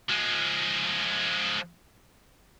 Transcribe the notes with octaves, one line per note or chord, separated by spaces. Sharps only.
F3 G#3